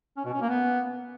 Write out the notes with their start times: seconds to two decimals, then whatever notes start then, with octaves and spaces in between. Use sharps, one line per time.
0.17 C#4
0.25 B2
0.33 C#4
0.41 A#3
0.49 B3